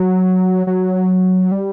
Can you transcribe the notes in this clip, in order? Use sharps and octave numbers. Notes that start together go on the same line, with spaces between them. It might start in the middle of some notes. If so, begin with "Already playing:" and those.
Already playing: F#3
F#3
G3